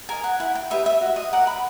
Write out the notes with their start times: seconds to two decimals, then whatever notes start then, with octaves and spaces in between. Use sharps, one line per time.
0.09 A#4 D#5 G#5
0.24 F#5
0.40 E4 F#5
0.55 G5
0.70 G4 B4 D#5 E5
0.86 E5
1.01 F#4
1.16 D#5
1.33 A#4 D5 F#5
1.47 B5